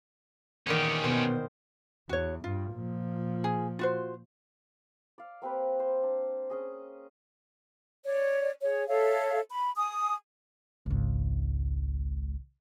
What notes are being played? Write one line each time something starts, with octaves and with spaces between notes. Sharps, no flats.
E2 A#2 D#3 C#4 G4
B2 B3 C5
E2 F#4 C#5
G2 F4
A#2 F3
G#4
F4 F#4 C5
D5 F5
A#3 C4 G4 B4
C5
D4
C#4 G#4 D#5
C#5 D5
G#4 C#5
A4 C#5 E5 F5
B5
G#5 D#6
G#1 C#2